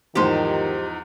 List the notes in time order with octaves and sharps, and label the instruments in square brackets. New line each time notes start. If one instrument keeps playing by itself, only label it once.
[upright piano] E2 G#2 F3 [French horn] D#3 [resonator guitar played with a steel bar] G4 C5